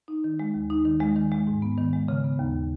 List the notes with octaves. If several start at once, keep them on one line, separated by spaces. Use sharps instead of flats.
D#4
D#3
G#3
D#2
D#4
D#3
G#3
D#3
G#3
G#2
B3
D#3
G#3
C#3
B3
D#2